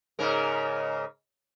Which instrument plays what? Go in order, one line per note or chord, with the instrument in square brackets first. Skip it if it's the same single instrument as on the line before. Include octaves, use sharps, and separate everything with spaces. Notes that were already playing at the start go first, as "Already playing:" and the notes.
[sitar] G#2 C#3 A#4